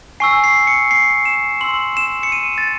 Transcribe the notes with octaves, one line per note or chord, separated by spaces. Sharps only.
G#5 C#6 E6 C7
C7
C#7
C7
E7
C6 E6 F#7
E7
C#7
D#7
A6